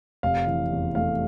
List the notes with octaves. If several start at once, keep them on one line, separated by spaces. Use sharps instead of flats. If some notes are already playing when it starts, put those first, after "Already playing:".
F1 F5
E3
E2
A3 F5